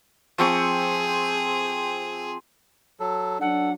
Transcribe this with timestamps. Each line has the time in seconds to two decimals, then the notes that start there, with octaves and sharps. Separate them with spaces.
0.38 F3 C4 G#4 C#6
3.00 F#3 A4
3.41 F#3 D4 A4 F#5